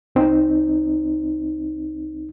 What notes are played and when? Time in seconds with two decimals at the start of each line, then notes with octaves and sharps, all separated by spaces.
0.15 C2 C4 D#4